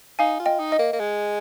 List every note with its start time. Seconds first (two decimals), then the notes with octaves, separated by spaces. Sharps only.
0.19 D#4 F5 G#5
0.40 F4
0.46 D#5 G5
0.59 D#4
0.72 D#5
0.79 A#3
0.93 A#3
1.00 G#3